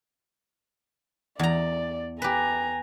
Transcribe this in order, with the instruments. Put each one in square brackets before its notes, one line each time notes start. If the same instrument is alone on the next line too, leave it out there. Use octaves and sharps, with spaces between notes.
[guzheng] E2 A#5 [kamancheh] D5
[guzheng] G4 B4 [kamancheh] G#5 A#5